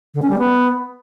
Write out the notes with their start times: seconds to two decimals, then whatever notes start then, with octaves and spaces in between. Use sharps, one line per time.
0.14 D3
0.22 C#4
0.30 G3
0.38 B3